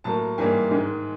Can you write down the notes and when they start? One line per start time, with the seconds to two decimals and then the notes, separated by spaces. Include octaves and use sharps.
0.04 A2 F#3 A#3 A5
0.38 G#2 E3 G3 A#3 G#5
0.71 G#2 D#3 G#3